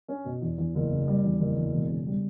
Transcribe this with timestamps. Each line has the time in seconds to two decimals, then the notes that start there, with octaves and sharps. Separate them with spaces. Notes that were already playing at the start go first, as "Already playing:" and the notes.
0.08 C#4
0.24 B2
0.42 E2
0.58 E2
0.75 F#1
0.91 C#3
1.07 G3
1.24 E2
1.40 F#1
1.56 E2
1.73 E1
1.89 C#3
2.06 G3